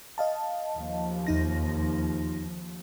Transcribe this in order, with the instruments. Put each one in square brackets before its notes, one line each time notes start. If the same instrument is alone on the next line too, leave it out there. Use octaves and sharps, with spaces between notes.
[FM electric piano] D#5 F5 A5
[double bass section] D#2 F3
[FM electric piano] E2 D#4 A#6